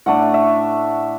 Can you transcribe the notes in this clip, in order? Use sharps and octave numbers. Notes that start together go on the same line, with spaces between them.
A2 A3 D4 F#5
E5